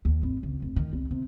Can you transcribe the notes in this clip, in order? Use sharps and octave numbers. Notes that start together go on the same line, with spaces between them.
D#2
G#1
C#2
F1
D#3
C2
C3